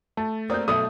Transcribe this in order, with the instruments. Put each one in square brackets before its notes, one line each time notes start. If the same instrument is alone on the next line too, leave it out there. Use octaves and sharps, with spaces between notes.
[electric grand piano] A3 [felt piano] A5
[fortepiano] A#3 C4 D5 [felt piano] D#6 G6
[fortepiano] B1 [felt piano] A4 E5 [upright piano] D#6